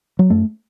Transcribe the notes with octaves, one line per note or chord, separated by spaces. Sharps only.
F#3
F#2 A3